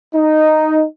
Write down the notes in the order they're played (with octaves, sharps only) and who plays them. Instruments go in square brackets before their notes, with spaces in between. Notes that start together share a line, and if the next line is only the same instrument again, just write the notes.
[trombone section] D#4